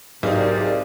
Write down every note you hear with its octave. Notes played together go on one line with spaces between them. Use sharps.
B1 G#2 C3 G4 G#4 A#4 D5